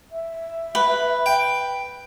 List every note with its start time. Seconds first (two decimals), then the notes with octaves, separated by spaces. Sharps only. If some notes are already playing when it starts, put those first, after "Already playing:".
0.12 E5
0.75 B4
1.26 G5